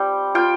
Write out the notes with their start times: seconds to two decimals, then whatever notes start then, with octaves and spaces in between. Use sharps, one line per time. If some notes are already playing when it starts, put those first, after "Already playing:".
Already playing: G3 C4 G5
0.35 F4 G5